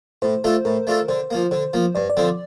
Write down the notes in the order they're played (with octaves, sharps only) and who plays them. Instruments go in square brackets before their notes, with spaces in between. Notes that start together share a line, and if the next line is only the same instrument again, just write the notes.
[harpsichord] A2 [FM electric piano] C5
[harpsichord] A3 D4 F4 A4
[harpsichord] A2 [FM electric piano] A#4
[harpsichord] A3 D4 F4 A4
[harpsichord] D3 [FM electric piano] C5
[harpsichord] F3 A#3
[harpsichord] D3 [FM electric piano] C5
[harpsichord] F3 A#3
[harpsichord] G2 [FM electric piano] D5
[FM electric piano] D5
[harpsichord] D3 F3 C4